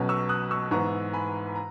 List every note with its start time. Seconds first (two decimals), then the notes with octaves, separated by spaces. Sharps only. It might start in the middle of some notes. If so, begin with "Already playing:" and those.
Already playing: B1 B2 F#3 C#4
0.09 C#6 E6
0.29 D#6 F#6
0.51 C#6 E6
0.71 G#2 E3 B3 A#5 C#6
1.13 G#5 B5
1.48 B5
1.55 A#5